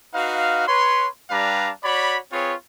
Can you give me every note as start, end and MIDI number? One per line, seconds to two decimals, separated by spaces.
0.14 0.64 63
0.14 0.64 66
0.14 0.64 71
0.14 0.64 77
0.68 1.08 71
0.68 1.08 73
0.68 1.08 84
1.30 1.71 55
1.30 1.71 62
1.30 1.71 67
1.30 1.71 71
1.30 1.71 77
1.30 1.71 82
1.84 2.18 66
1.84 2.18 73
1.84 2.18 74
1.84 2.18 83
2.32 2.54 60
2.32 2.54 65
2.32 2.54 68
2.32 2.54 71
2.32 2.54 73